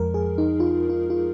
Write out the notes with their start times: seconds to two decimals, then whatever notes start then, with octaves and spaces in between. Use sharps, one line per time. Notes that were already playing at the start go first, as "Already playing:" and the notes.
Already playing: F2 F3 G#3 A#4
0.14 G#4
0.38 D#4
0.60 F4
0.90 F4
1.10 F4